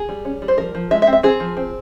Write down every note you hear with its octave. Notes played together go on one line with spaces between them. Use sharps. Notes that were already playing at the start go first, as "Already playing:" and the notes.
Already playing: G#4
G3
C#4
G3
C5
F3 A#4
F3
G#3 E5
E5
C4
E5
C4 G#4
F3
C4